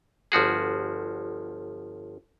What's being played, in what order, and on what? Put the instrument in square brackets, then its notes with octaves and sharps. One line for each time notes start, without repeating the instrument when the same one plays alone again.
[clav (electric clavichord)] G1 F3 F#4 G#4